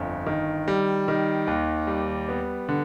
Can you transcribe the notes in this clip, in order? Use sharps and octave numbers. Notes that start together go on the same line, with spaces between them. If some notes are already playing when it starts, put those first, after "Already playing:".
Already playing: G1 F2
D#3
G3
D#3
D#2
G3
B3
D3